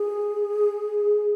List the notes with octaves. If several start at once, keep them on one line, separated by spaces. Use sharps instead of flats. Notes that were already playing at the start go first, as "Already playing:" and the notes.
Already playing: G#4